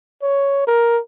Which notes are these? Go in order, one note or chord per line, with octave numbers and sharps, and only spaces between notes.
C#5
A#4